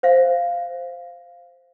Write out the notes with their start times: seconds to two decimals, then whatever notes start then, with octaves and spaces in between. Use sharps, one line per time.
0.03 C5 E5 F5